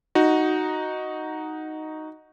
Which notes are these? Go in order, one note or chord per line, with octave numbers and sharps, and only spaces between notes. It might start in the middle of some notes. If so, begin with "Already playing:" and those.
D#4 F#4